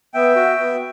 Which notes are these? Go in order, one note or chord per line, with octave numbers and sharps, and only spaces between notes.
B3 E5 G5
F#4
B3